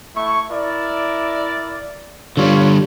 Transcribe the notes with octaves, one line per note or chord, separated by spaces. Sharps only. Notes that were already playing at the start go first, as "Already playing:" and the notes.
A3 E4 C#6
E4 A#4 D5
D3 G3 F4 C#5